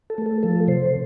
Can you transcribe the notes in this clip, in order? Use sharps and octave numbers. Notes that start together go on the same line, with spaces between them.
A4
A3
A4
F3 A4
C3 C5